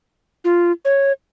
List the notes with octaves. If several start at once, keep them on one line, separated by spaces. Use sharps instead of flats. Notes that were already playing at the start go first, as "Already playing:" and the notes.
F4
C#5